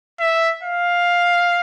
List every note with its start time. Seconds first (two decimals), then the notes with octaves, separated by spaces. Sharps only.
0.20 E5
0.63 F5